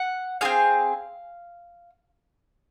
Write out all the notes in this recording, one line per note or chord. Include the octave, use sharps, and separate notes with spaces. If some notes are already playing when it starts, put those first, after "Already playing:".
Already playing: F#5
C4 F4 G#4 F5